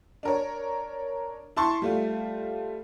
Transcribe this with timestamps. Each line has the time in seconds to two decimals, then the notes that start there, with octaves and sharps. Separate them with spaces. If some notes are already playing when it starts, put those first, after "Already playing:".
0.23 D4 A#4 C#5
1.56 E4 A5 C6 C#6
1.82 G3 A3 F4